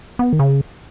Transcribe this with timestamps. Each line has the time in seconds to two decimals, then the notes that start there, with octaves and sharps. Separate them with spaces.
0.19 B3
0.33 D#3
0.39 C#3